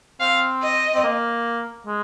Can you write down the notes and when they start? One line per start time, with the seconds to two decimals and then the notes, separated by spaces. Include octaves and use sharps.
0.20 C4 F5
0.63 D#5
0.94 C4
1.04 A#3
1.87 G#3